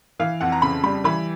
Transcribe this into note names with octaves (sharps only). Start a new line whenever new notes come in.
E3 F5
F2 F#5
A#5
C#3 B5
G3 B5
E3 B5